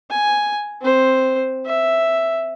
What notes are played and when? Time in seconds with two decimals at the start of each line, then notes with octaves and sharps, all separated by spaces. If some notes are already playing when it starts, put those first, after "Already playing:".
0.10 G#5
0.81 C4 C5
1.66 E5